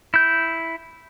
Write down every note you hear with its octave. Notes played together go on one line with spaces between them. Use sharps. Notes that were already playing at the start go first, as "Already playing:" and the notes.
E4 G6